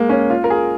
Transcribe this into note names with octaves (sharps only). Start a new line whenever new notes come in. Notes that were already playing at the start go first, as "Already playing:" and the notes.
Already playing: G#3 A#3
C#4
F4
A#4
G#4